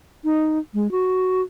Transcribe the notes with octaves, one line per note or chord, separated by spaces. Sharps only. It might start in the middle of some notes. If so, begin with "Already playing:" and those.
D#4
G#3
F#4